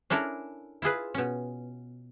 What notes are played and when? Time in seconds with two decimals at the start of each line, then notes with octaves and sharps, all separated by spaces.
0.10 C#4 D4 E4 A4 A#4
0.82 E4 F4 G#4 B4
1.14 B2 C#4